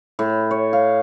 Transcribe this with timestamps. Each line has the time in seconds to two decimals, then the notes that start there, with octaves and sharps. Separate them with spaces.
0.19 A2
0.51 C#5
0.73 F5